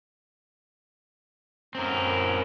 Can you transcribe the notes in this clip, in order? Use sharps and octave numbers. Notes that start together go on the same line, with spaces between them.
F#2 C4 A#4